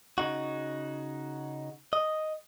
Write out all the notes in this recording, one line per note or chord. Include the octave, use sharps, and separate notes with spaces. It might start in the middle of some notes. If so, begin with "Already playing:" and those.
C#3 D#4 F#4
D#5